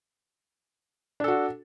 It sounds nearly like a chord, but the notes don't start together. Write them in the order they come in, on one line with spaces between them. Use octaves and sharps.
D4 A4 F#4